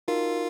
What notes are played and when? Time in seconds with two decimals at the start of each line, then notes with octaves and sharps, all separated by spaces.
0.08 D#4 F4 F#4 A#4